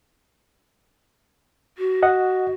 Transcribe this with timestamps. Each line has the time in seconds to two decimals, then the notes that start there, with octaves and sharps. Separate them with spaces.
1.78 F#4
2.03 D#5 F#5